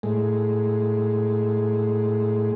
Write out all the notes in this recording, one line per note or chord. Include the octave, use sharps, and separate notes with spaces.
A2 G#3